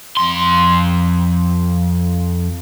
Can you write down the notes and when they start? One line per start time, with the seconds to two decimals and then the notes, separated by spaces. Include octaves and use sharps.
0.17 F2 C6